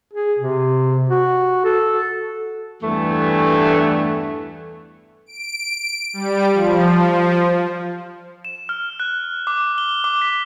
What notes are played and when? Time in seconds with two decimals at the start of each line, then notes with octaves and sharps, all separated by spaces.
0.13 G#4
0.39 C3
1.09 F#4
1.64 A4
2.83 E2 G2 E3 A3
5.26 D7
6.13 G3
6.53 F3
8.45 E7
8.69 F6
9.00 F#6
9.47 D6
9.78 G7
10.04 D6
10.22 B6